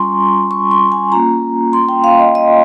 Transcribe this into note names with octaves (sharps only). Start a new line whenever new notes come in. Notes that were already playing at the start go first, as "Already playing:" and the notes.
Already playing: G3 C#4 F4 G#5 A#5 C6 C#6
C#6
C6
G#5
A#3 C#4 F4 A#5
C6
G5
F5
D#5
D#5